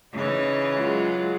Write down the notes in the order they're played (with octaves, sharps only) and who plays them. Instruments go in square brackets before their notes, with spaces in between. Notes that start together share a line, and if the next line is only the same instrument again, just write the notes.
[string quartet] C#3 E3 C#5 [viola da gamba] D#4
[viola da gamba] F#3 G#3 F4